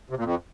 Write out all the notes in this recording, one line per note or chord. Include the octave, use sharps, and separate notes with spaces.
C3
A#2
F2